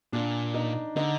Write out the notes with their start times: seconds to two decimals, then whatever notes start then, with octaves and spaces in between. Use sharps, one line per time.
0.13 A#2 D4
0.54 D#4
0.96 D3 D#4